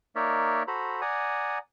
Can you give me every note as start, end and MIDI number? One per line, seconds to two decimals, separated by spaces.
0.16 0.63 58
0.16 0.63 63
0.16 0.63 70
0.16 0.63 73
0.16 0.63 74
0.16 0.63 76
0.67 1.01 66
0.67 1.01 69
0.67 1.01 72
0.67 1.01 82
0.67 1.01 83
1.01 1.58 74
1.01 1.58 78
1.01 1.58 80
1.01 1.58 82
1.01 1.58 87